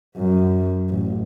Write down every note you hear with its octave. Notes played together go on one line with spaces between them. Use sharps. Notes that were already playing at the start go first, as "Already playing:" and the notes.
F#2
A1